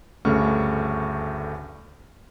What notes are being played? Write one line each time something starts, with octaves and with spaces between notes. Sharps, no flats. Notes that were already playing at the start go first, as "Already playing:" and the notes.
D2 G2 C#3 A3 C#6 F6